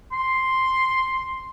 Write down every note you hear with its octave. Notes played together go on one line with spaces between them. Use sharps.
C6